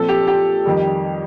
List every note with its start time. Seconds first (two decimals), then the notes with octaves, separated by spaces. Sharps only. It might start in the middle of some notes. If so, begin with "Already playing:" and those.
Already playing: A#2 F3 C4 A4
0.09 G4
0.27 G4
0.65 F2 D#3 G3